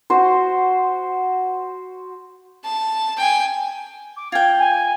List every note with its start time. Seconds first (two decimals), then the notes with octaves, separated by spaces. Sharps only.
0.10 F#4 C5
2.64 A5
3.17 G5 G#5
4.17 D6
4.32 F4 G5 G#6
4.59 G#5